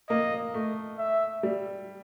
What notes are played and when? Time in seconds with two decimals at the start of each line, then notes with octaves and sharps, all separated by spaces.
0.10 A#3 D#5
0.54 A3
0.98 E5
1.43 G3